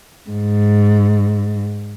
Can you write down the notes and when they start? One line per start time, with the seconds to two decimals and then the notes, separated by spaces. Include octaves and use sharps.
0.30 G#2